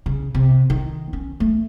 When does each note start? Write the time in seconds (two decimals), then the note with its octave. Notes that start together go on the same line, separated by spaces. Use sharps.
0.06 C#3
0.35 C3
0.70 D#3
1.13 C#4
1.40 A3